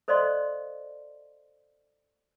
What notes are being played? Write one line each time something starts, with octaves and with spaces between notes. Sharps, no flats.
A4 C5 D5 D#5 F5 C6